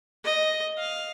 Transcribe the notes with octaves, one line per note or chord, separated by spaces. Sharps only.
D#5
F5